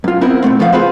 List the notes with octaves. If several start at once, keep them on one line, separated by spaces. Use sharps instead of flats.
F#2 F4
B3 C4 E4 F4 A#4
B2 D3 A3 C4
C2 F3 A3 B3 C#5 F5
F4 G#4 B4 C5